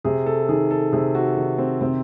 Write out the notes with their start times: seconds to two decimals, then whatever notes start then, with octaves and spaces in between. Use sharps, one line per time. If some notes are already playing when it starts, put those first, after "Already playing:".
0.04 C3 G#4
0.26 A4
0.49 D#3 G#4
0.71 A4
0.92 C3 G#4
1.15 F#4
1.37 D#3
1.58 C4
1.81 C3 C4